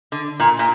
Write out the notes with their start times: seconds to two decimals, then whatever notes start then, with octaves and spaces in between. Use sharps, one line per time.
0.12 D3
0.40 A#2
0.59 A#2